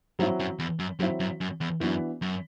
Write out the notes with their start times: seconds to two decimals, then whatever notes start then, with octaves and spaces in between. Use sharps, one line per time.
0.19 G2 F#3 C4 E4
0.40 F#2
0.59 E2
0.79 F#2
0.99 F#2 F#3 C4 E4
1.20 F#2
1.41 F#2
1.61 E2
1.80 F#2 E3 B3 D4 F#4 B4
2.22 F#2